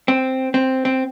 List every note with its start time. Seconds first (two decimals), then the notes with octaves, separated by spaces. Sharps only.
0.08 C4
0.54 C4
0.85 C4